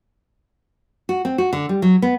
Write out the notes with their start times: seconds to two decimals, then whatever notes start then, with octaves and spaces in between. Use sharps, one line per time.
1.09 F#4
1.25 C4
1.38 F#4
1.53 D3
1.69 G3
1.82 F#3
2.02 B3